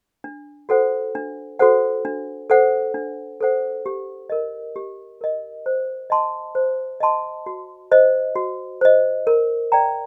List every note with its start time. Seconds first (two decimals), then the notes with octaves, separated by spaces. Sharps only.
0.24 D4
0.69 F#4 A4 C5 F#5
1.15 D4
1.59 F#4 A4 C5 F#5
2.05 D4
2.50 A4 C5 F#5
2.94 D4
3.41 A4 C5 F#5
3.86 G4
4.30 A#4 D#5
4.76 G4
5.21 A#4 D#5
5.66 C5
6.10 D#5 A5 C6
6.55 C5
7.00 D#5 A5 C6
7.46 F#4
7.92 C5 D#5
8.36 F#4
8.81 C5 D#5
9.27 A#4
9.72 D5 G5 A#5